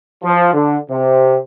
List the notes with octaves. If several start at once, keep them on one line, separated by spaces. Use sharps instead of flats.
F3
D3
C3